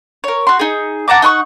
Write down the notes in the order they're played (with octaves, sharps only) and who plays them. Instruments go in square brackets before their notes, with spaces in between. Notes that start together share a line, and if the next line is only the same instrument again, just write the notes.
[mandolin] A#4 C#5
F#4 C6
D#4 G#4
F#5 A5 A#5 D6
D#4 F#5 C6 C#6